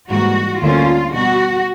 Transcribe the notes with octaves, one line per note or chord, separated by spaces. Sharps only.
G#2 E3 G3 A#3 F#4
D2 D3 G3 A#3 C#4 F4
B2 G3 B3 F#4